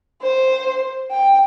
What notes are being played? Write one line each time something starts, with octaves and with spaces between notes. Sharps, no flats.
C5
G5